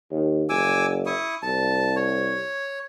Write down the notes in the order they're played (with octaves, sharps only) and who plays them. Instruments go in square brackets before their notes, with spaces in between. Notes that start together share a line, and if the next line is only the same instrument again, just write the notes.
[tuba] D#2
[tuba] F#1 [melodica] G#5 D6 E6
[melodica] E4 C#6 D#6
[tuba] C2 [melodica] A5
[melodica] C#5